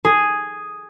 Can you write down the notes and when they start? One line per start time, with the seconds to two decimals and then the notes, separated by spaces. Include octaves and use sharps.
0.05 G#4